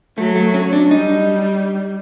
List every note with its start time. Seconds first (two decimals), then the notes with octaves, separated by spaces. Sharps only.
0.18 F#3 A3
0.36 A3
0.54 C#4
0.73 D4
0.91 G3 D#4